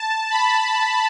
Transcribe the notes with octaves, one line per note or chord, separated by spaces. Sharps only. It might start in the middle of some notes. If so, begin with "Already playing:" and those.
Already playing: A5
B5